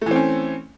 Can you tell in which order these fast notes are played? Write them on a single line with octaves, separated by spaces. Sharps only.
A3 E3 C4 C#4